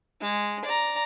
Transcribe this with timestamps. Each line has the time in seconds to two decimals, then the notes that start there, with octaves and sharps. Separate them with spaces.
0.21 G#3
0.65 D5 A#5